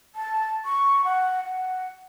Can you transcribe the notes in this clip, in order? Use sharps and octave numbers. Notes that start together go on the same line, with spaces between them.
A5
C#6
F#5
F#5